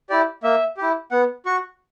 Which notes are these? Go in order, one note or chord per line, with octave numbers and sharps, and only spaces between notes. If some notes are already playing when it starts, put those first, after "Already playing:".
E4 G4 D5
A#3 E5
E4 G4
B3 F#5
F#4 C#6